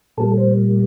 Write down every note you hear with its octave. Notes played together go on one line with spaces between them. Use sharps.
A#2 G3 A#3 A4
C5